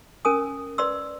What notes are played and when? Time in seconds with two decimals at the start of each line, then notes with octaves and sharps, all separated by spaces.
0.25 C#4 A#4 G#5 D#6
0.78 B4 D5 C6 E6